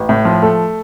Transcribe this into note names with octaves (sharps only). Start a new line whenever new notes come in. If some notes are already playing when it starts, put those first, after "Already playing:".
Already playing: A1
A2
F3
A3